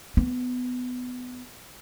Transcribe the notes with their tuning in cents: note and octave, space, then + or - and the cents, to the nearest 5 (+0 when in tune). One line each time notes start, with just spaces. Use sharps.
B3 +15